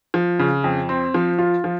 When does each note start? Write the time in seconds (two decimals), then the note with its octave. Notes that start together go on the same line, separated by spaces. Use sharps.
0.14 F3
0.39 C#3
0.64 F2
0.89 C4
1.14 F3
1.38 F4
1.64 F3